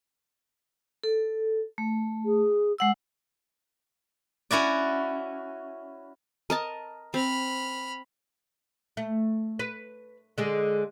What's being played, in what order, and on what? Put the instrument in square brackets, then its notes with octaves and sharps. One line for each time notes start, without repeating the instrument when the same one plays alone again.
[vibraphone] A4
A3
[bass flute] G#4
[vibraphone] G#3 F#5 E6
[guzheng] C#4 E4 F#4 D5
[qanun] A#4 D#5 A5
[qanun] C4 [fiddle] B5 F6
[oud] A3
B4
D3 G#3 G#4